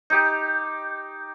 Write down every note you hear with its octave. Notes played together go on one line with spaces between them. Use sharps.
D#4 G4